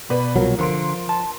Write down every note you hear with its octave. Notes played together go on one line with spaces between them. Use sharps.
B2 B4 D5 B5
C2 F3 F#3 A#4
D3 F3 A#4 C6 D7
A5